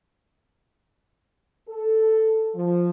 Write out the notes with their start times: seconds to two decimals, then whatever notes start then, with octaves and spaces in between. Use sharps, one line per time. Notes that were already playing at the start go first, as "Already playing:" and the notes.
1.68 A4
2.55 F3